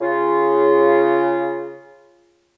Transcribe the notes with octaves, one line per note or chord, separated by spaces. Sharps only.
C#3 F4